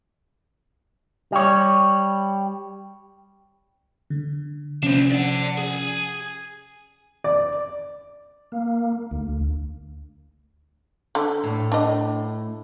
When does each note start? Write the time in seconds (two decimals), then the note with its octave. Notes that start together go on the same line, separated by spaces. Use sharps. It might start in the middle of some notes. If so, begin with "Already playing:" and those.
1.32 G3 C#5
4.10 D3
4.83 C3 F3 C#4 D4 C5
5.11 D5 F#5
5.57 G#4
7.24 D5
8.52 A#3
9.11 D2
11.15 D3
11.44 A2
11.72 D4 D#5